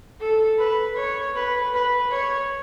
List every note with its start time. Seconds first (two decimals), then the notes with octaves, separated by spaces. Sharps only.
0.19 A4
0.58 B4
0.96 C#5
1.35 B4
1.73 B4
2.11 C#5